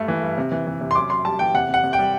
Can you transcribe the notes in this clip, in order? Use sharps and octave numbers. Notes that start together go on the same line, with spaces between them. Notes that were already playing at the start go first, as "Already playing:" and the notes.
Already playing: G2 A3
E3
G2
C3
E3
E3
C3
C6
F#2 D6
F#2 C6
G3 A5
E3 G5
C3 F#5
C3
F#5
C3
G5
G3